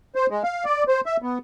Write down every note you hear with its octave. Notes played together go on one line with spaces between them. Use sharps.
C5
G#3
F5
D5
C5
E5
B3